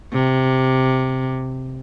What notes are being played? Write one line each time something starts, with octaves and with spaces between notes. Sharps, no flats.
C3